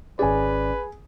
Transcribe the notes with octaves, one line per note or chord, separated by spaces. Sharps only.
G#1 C#4 G#4 B4 D5 G#5